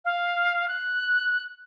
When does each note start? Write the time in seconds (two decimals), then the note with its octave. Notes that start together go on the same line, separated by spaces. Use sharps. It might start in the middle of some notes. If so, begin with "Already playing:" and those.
0.05 F5
0.68 F#6